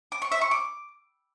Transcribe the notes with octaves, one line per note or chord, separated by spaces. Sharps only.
D6
C#6
E5
C#6
D6